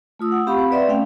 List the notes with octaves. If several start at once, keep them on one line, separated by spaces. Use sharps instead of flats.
A3 F4 D#6 E6
F#5
C4 G4 F5 F#5 B5 C#6
C4
B4 D5 E5 C6
A3 C#4 F5 G5